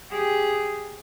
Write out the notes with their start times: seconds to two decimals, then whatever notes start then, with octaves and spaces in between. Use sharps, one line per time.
0.11 G4 G#4